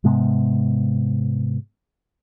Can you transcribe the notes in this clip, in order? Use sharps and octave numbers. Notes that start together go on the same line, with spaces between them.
G#2 C3 G#3 B3